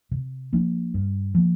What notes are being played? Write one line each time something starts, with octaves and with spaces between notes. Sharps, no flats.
C3
F3 A#3 D4
G2
F3 A#3